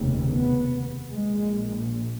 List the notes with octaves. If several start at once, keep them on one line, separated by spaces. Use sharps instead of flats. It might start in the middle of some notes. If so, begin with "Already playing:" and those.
Already playing: F1 D#2 C#3
B3
A#1 A#2 G#3